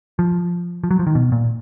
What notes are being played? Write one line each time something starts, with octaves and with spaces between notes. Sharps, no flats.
F3
F3
F#3
F3
D#3
B2
A#2